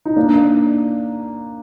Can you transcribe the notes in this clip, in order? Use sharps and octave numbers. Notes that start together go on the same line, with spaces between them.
D#4
A#3 D4